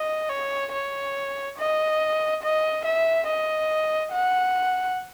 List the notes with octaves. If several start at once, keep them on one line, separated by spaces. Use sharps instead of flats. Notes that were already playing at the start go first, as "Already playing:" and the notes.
Already playing: D#5
C#5
C#5
D#5
D#5
E5
D#5
F#5